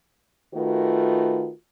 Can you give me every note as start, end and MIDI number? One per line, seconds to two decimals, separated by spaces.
0.54 1.49 51
0.54 1.49 57
0.54 1.49 65
0.54 1.49 66
0.54 1.49 71